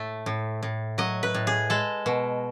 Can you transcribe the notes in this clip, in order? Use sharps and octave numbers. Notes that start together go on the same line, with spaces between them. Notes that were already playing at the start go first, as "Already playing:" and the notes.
Already playing: A2 A3
A2
A2
F#3 D#5
B4
A2
G#4
G#3 A4
B2